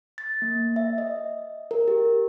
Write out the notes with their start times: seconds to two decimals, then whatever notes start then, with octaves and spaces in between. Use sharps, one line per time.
0.18 A6
0.42 A#3
0.76 E5
0.98 D#5
1.71 A#4
1.88 G4